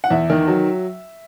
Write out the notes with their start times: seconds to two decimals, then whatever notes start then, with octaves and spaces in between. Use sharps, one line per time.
0.04 F#5
0.10 E2 E5
0.30 D#3
0.48 F#3